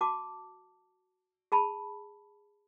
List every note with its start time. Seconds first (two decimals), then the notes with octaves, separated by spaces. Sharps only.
0.01 F#4 A5 D6
1.52 G#4 A5 B5